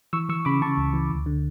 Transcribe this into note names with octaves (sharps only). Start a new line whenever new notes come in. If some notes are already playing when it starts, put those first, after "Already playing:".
E3 C#6 E6
E3 C#6 E6
C#3 B5 D6
C#3 A5 C#6
C#2
E3
D2
D3